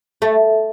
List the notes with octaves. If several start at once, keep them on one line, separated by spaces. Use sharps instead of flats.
A3